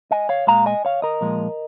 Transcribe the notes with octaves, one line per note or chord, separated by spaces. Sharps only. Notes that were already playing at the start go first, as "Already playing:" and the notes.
D#5 G#5
C#5 F5
A#2 G#3 F5 A#5
D#5 G#5
C#5 F5
A#4 D#5
A#2 F3 G#3